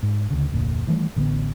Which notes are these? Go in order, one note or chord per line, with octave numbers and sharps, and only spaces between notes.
G#2
D2 C#3
F1 D2 A#2
D#3 E3 G3 A3
A1 D3 D#3 B3